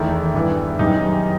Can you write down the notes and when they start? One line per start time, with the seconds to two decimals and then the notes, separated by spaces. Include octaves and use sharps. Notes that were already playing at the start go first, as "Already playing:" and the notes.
Already playing: E2 D#3 A3 E4
0.34 G2 E3 B3
0.79 F#2 D#3 G3 B3 D#4